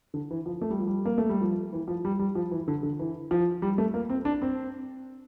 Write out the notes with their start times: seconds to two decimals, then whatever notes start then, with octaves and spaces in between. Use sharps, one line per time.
0.14 D3
0.31 E3
0.46 F3
0.62 A3
0.70 G3
0.79 F3
0.87 G3
1.06 A#3
1.18 A3
1.29 G3
1.41 F3
1.73 E3
1.88 F3
2.05 G3
2.19 G3
2.35 F3
2.51 E3
2.68 D3
2.83 D3
2.99 E3
3.31 F3
3.62 G3
3.78 A3
3.94 A#3
4.10 C4
4.25 D4
4.42 C4